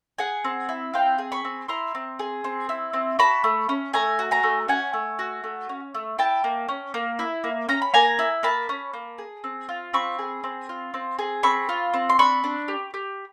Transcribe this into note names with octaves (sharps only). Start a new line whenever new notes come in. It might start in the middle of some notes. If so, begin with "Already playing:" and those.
G#4 F#5 G#5
C4
E4
C4 F5 G5
G#4
B5 C#6
C4
E4 A#5 C6
C4
G#4
C4
E4
C4
F#4 A5 B5
A3
C#4
A3 G#5 A#5
F#4
G#5 A#5
A3
C#4 F#5 G#5
A3
F#4
A3
C#4
A3
E4 G5 A5
A#3
C#4
A#3
E4
A#3
C#4 A#5
B5
A#3 G#5 A#5
E4
A#3 A5 B5
C#4
A#3
G#4
C4
F4
C4 B5 C#6
G#4
C4
F4
C4
G#4
C4 B5 C#6
F4
C4
C6
D4 B5 C#6
D4
G4
G4